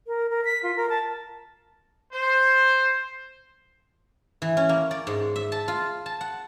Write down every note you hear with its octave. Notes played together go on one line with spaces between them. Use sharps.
A#4
A#4
B6
F4
A#4
A5
C5
E3
C#4
A#3
D5
G#2
E5
A5
F4
A5
F#5